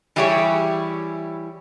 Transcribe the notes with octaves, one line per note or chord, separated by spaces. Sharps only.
E3 G3 E4 G4 G#4 C#5